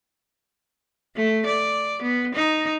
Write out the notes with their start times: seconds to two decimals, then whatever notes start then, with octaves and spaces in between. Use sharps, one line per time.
1.15 A3
1.46 D5
2.02 B3
2.34 D#4